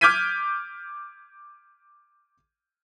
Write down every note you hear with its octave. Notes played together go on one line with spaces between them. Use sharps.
D6 F6 G6 G#6 B6 D#7